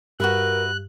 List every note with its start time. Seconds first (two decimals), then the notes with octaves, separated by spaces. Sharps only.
0.20 G2 F#4 A#4 B4 E5 F#6